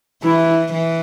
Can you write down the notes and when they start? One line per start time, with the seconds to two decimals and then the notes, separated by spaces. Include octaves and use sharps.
0.24 E3 E4
0.73 E3